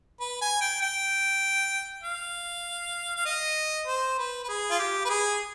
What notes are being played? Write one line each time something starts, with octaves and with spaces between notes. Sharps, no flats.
B4
G#5
G5
G5
F5
F5
D#5
C5
B4
B4
G#4
F4
G4
B4
G#4